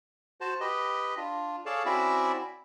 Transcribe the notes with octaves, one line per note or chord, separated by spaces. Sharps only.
F#4 C5 A5
G4 B4 D#5
D4 F4
G#4 A4 C#5 D5 F5 A5
C4 C#4 E4 F#4 D5 E5